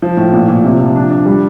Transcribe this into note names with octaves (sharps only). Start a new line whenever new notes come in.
F3
A2
A#2
A#2
C3
F3
D4
D4
G3